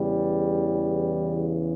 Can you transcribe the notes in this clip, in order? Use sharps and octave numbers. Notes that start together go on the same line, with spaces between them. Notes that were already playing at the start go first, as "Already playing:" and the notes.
Already playing: E2 C#3 E3 G3